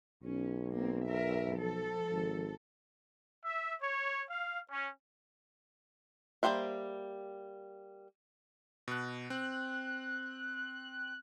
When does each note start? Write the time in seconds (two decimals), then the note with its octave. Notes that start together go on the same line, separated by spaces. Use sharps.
0.23 B1 C#4
0.73 A#3 C4
1.07 A#4 E5
1.54 F3 A4
2.11 G#1
3.45 E5
3.81 C#5
4.29 F5
4.70 C#4
6.43 G3 A#3 G4 C5 E5
8.88 B2 F#6
9.30 C4 F#6